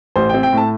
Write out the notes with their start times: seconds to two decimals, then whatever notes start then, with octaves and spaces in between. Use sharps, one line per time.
0.16 A1 C5
0.29 C4 G5
0.43 G5
0.52 A2 A5